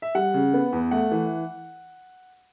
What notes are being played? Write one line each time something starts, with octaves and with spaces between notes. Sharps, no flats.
E5
G3 F#5
C#3
B3
E2
A3 F#5
E3